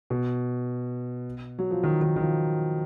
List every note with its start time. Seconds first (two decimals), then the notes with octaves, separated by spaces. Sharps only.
0.10 B2
1.59 F#3
1.71 F3
1.83 D#3
2.02 D#3
2.16 D#3
2.21 F3